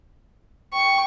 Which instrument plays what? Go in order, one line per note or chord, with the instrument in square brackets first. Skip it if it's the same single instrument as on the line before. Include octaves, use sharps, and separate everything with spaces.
[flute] G5 [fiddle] C#6